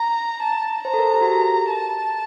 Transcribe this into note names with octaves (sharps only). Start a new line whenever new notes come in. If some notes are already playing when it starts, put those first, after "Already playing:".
Already playing: A#5
A5
C5 A#5
A4
A#4
A4
G4
F#4
G4
A5